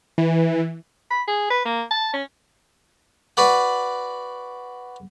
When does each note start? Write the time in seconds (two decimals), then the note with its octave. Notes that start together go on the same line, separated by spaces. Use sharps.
0.18 E3
1.11 B5
1.27 G#4
1.50 B4
1.65 A#3
1.91 A5
2.13 C#4
3.37 F#4 B4 D5 F#5